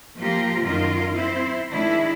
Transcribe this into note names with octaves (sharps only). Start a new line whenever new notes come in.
F3 A#3 F4 G4 A#4
F#2 D#3 F4 A#4
C4 E4 C5
D#3 G#3 D4 E4